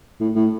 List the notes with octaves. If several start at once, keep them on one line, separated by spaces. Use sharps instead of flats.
A2
A2